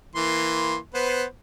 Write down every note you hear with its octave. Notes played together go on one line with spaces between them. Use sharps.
E3 A#3 C6
B3 B4 C5